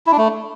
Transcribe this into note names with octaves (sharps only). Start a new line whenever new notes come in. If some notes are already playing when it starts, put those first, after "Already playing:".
E4
D4
A3